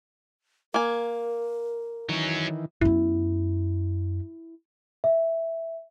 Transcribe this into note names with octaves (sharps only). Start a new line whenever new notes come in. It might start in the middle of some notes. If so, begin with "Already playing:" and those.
A#3 A#4 G#5
D#3 E3 F#3 C#4
F#2 B3 E4
E5